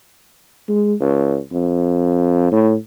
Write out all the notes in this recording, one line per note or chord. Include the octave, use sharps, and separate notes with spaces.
G#3
C#2
F2
A2